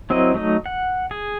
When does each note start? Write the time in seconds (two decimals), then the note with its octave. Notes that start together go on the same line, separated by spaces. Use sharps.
0.10 F#3 C4 E4 A#4 D#5
0.34 F#3 A3 D#4 D#5
0.66 F#5
1.11 G#4